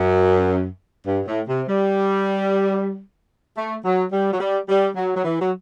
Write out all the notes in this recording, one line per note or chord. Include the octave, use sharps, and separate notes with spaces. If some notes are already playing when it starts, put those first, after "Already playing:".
Already playing: F#2
G2
A2
C3
G3
A3
F#3
G3
F#3
G3
G3
F#3
F#3
E3
F#3